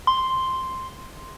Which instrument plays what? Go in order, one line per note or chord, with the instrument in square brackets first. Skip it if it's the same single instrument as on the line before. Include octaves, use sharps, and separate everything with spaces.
[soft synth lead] C6